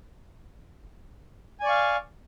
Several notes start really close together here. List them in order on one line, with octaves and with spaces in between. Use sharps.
G#5 D5 C#6 F5